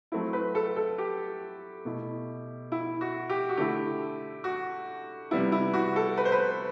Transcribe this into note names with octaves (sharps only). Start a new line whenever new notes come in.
F#3 A3 C4 E4
B4
A4
A4
G4
B2 A3 E4
E4
F#4
G4
F#4
D3 A3 E4 G4
F#4
C3 G3 B3 E4
E4
F#4
A4
B4
C5
B4